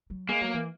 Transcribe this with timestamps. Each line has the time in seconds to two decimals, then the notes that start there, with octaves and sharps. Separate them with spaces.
0.10 F#3
0.29 G#3 A#3
0.41 F#3
0.54 E3